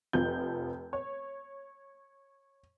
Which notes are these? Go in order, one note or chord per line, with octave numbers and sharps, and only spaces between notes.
F1 F3 G6
C#5